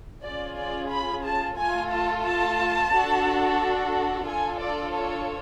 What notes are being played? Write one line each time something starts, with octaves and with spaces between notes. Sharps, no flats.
C#4 F4 G#4 D5
D5
B5
A5
A3 F4 A4 G#5
A5
A5
D4 F#4 A4
D4 F4 A4 G#5
D5
C#5